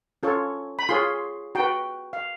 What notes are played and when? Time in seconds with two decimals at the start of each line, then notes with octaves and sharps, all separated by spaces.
0.23 C#4 F4 A4 C#5
0.79 B5
0.89 F4 G#4 C#5 C6
1.55 F#4 B4 G5
2.13 F5